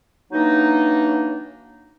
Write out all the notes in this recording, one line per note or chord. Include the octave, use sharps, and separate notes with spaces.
E3 F#3 A#3 D4 D#4